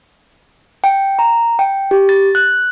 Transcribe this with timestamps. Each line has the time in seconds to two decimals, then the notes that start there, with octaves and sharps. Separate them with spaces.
0.84 G5
1.19 A#5
1.59 G5
1.91 G4
2.09 A6
2.35 F#6